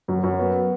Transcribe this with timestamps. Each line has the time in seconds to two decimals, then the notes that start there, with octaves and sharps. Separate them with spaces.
0.08 F#2
0.23 F#2
0.39 B3